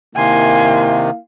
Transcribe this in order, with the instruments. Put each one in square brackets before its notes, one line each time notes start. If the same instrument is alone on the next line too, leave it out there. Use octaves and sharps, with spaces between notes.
[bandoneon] C3 D#3 [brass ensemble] A#3 E4 F5 [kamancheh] G#5 C6